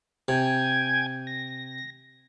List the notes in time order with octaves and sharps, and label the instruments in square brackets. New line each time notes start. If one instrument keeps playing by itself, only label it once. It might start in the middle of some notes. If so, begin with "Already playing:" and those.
[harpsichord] C3 [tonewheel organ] G5 G#5 G#6
[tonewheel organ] A#6